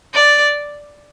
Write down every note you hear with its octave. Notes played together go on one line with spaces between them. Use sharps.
D5